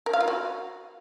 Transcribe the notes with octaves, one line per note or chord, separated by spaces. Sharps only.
A#4
F5
F4
F#4